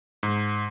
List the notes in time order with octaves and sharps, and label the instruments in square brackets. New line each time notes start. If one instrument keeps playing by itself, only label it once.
[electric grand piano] G#2